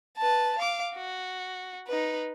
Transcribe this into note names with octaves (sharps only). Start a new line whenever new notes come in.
B4 A5
F5 D6
F#4
D#4 B4